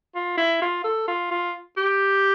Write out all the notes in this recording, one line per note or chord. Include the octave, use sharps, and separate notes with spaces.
F4
E4
F4
A4
F4
F4
G4